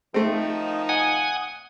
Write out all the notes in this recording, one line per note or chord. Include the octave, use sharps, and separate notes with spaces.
D#3 F3 A3 C4 D#4
F#5 G#5 D#6